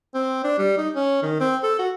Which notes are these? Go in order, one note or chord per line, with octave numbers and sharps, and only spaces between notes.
C4
D4
G3
D#4
C#4
D#3
C4
A4
F#4